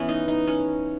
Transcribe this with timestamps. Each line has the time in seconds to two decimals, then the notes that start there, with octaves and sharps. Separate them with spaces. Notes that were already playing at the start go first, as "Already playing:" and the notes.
Already playing: E3 B3 C#4
0.09 D#4
0.28 D#4
0.47 C#4